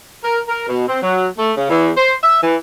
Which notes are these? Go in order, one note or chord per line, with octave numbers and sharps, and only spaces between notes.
A#4
A#4
B2
C4
F#3
A3
C#3
E2
C5
E5
E3